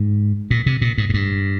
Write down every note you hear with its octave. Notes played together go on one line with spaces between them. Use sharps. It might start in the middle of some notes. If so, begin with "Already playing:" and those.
Already playing: G#2
A#2
C3
A#2
G#2
G#2
G2